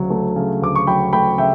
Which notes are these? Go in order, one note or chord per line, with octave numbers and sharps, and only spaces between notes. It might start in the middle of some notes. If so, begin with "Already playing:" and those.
Already playing: D2 C#3 F#3
A3
C#3
D2 D6
C#6
F#3 G5 B5
A3 G5 B5
C#3 E5 G5